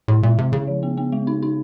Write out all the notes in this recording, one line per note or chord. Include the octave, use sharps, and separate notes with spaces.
A2 E4
A#2 G#3
C3 G#3
C#3 E4
F3
B3
B3
G#3
D#4
D#4